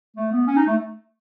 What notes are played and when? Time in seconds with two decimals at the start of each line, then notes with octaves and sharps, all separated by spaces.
0.17 A3
0.32 B3
0.47 C#4
0.56 D#4
0.67 A3